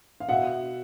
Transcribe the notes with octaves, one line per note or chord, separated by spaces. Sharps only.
F5
B2 E5 F#5